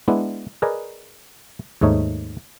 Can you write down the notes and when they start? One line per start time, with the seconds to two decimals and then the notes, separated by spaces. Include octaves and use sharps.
0.08 G#3 B3 D4 E4
0.62 G#4 A#4 B4 D5 D#5 G#5
1.81 D#2 G#2 A3 D#4 C#5